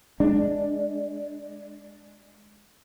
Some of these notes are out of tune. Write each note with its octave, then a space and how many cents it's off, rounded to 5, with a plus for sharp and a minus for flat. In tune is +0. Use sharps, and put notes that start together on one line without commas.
G#3 +0 D4 +0